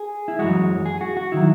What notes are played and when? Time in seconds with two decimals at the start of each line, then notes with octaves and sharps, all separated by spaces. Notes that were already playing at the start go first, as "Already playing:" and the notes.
Already playing: G#4
0.28 E4
0.39 F#2 E3 G#3 F#4
0.86 G#4
1.01 F#4
1.17 F#4
1.32 D#3 F#3 E4